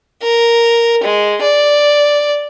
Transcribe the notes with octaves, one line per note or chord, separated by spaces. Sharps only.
A#4
G#3
D5